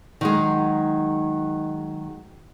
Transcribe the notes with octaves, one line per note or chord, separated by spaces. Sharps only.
D#3 F#3 G#3